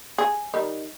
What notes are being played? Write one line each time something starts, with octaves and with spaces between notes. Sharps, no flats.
G#4
D#3 G3 D#4